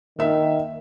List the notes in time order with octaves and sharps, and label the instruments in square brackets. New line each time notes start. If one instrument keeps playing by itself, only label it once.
[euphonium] D#3 [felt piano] A#3 E5